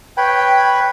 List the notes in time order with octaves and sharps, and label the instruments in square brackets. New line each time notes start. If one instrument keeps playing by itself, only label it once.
[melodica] B4 C#5 B5 [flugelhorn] G5